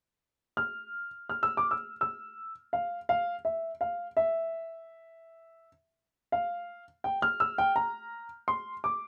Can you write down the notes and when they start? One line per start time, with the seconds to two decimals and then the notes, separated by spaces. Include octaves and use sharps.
0.57 F6
1.29 F6
1.43 E6
1.57 D6
1.71 E6
2.01 E6
2.73 F5
3.09 F5
3.45 E5
3.81 F5
4.17 E5
6.32 F5
7.04 G5
7.22 F6
7.40 E6
7.58 G5
7.76 A#5
8.48 C6
8.84 D6